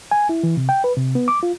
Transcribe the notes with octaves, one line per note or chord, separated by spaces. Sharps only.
G#5
E4
E3
C3
G5
B4
C3
B3
D6
F4